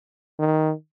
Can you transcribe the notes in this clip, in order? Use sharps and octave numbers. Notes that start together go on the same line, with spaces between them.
D#3